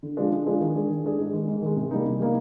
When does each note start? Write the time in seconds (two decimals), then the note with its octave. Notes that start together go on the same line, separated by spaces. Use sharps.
0.03 D3
0.17 F3 G#3 D4
0.31 D3
0.46 F3 G#3 D4
0.61 D#3
0.75 G#3 D4 G#4
0.89 D#3
1.04 G#3 D4 G#4
1.19 G#2
1.33 D#3 G#3
1.48 G#2
1.62 D#3 G#3
1.76 C3
1.91 G3 A#3 D#4
2.05 C3
2.20 G3 A#3 D#4